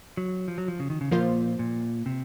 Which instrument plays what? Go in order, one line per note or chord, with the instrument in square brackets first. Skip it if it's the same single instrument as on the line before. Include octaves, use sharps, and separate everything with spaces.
[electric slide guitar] F#3
F3
F#3
F3
C#3
D#3
C#3
[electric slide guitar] A#2 [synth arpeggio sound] F3 A#3 F4 C5
[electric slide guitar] A#2
C3